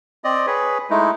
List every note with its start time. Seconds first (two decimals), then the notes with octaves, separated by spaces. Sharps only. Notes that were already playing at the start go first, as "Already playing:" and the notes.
0.24 C4 D5 D#5
0.47 G#4 B4 C#5
0.90 G#3 A3 D#4 E4